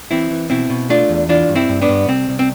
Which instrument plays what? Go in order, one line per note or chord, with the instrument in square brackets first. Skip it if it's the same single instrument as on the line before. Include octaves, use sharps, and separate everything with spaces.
[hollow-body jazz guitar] E3 C4 E4
E3
B2 C4 E4
B2
A3 D4 F4
E2
E3 D4 F4
G2
C4 E4
G2
B3 D4
G2
C2 C4
C2
C4